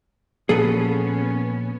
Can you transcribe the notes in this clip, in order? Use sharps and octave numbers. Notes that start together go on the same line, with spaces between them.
A#2 F3 A#3 B3 C#4 G#4 A4 B4